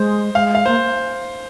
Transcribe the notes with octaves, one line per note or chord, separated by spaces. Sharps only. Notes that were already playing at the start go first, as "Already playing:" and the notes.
Already playing: G#3 C5
G#3 F5
F5
A#3 C5